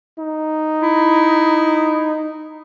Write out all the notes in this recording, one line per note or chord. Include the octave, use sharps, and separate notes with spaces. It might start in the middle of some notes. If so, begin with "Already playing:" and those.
D#4
E4